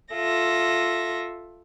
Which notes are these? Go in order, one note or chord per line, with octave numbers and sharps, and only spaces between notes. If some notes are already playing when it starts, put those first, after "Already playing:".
F4 A4 E5 A#6